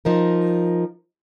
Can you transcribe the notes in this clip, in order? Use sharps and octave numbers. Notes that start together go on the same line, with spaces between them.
F3 D#4 A#4